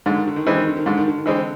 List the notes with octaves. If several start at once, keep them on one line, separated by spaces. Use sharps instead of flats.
G#2 D3
D#3
D3
D#3
D3 E3 G#3 C4
D#3
D3
D#3
G#2 D3
D#3
D3
D#3
D3 E3 G#3 C4